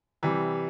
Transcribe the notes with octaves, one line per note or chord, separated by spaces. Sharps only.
C3 E3 G3